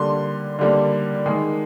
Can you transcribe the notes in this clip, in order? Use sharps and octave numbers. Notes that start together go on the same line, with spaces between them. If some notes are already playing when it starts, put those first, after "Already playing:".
Already playing: D3 G3 A#3 C6
D3 G3 A#3
D#3 G#3